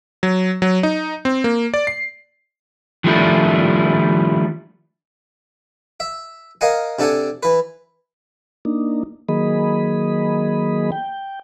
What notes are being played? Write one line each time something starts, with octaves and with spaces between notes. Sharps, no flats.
F#3
F#3
D#4
C4
A#3
D5
C7
D#3 F3 G3 A3 D4 E4
E5
A#4 D#5 F5 F#5 G#5
C3 D4 A4 F#5 G#5
E3 B4
A#3 D4 D#4
D#3 F#3 A#3 G#4 D#5 B5
G5